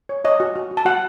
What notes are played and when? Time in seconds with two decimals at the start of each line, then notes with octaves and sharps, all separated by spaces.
0.09 C#5
0.24 C#5 D#5
0.40 F#4
0.56 F#4
0.71 F#4
0.77 A5
0.85 F#4 F#5